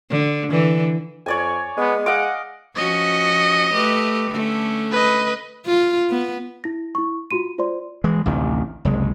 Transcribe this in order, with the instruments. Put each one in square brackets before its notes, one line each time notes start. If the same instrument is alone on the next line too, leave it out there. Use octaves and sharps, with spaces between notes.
[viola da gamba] D3
D3 E3
[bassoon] F2 [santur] C#5 D5 G#5
[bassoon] G#3 [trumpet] B3
[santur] D#5 F5 D6 [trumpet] F#5
[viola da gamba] F3 C#4 F#4 [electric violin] D#5
[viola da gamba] A3 G4 B4
D3 A3 C#4
[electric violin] B4 D#5
[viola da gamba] F4
B3
[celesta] E4 A#6
E4 C#6
F4 F#4 C6 D#7
F4 C5 D5 C6
[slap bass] E3 G#3
A1 D2 C3 D#3
F#1 C2 G#3